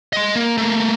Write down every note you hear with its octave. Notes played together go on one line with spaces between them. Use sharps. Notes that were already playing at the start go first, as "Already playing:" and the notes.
D#5 C6
A#3
A3 A#3